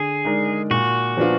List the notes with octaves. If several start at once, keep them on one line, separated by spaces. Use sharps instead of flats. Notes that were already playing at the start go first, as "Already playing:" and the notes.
Already playing: D3 G#4
G#3 D#4 A#4 D5
A#2 F#4
F3 B3 D4 F4